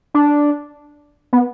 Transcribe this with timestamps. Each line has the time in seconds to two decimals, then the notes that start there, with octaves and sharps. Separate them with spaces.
0.14 D4
1.33 B3